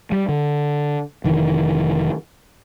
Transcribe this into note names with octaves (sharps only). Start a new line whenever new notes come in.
G3
D3
F1 D#3 E3